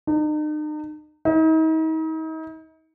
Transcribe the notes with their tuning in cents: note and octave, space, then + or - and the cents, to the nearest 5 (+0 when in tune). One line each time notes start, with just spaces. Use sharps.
D#4 -40
D#4 +40